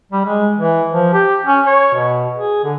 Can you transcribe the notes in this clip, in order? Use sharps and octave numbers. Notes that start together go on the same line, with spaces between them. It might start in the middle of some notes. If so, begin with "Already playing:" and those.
G3
G#3
E3
F3
G4
C#4
C#5
B2
G#4
D3